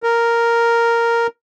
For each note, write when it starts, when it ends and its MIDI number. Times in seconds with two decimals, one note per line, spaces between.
0.03 1.27 70